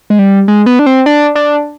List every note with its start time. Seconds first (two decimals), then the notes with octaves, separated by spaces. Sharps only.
0.10 G#3
0.19 G3
0.48 G#3
0.66 B3
0.79 D4
0.86 C4
1.06 D4
1.35 D4